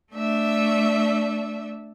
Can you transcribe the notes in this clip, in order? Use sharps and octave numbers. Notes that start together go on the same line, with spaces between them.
A3 D4 E5